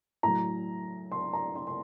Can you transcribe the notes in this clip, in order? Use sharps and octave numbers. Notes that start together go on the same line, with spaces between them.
A2 F#3 A#5
C6
A#5
C6
C6